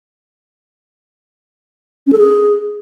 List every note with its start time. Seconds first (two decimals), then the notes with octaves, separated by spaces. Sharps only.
2.07 C#4
2.12 A4
2.18 G#4